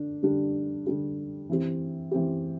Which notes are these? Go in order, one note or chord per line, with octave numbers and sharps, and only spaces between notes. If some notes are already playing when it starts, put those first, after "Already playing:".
Already playing: D3 D4
D3 G3 D4 G4
D3 G3 D4 G4
E3 C4 G4
E3 C4 G4